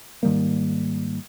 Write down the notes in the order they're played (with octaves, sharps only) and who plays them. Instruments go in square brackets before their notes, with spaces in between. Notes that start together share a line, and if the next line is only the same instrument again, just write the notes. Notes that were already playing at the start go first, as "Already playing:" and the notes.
[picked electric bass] G#2 D#3 G3 A#3